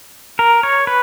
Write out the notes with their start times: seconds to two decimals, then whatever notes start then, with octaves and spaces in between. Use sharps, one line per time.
0.39 A#4
0.63 C#5
0.87 B4